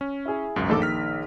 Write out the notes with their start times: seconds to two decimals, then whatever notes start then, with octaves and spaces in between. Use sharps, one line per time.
0.01 C#4
0.26 E4 G#4
0.56 G#1 C#2 F#2
0.69 A#1 G2 D#3 A4 D6
0.82 F6 B6